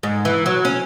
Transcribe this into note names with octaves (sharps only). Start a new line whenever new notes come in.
G#2
E3
F#3
C#4